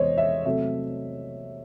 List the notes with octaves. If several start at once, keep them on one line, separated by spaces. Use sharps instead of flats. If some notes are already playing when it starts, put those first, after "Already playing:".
Already playing: E2 C3 E3 G#3 C5 C#5 D#5
E5
C3 F#3 A3 E5